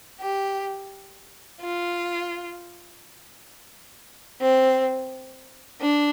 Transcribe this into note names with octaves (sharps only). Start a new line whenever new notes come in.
G4
F4
C4
D4